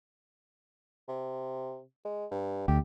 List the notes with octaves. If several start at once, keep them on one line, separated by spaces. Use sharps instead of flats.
C3
G#3
G2
D2 G4